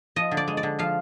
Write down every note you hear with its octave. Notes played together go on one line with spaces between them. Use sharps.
F3 D#5
D3
D5
G#3
D5
D3
F3 F5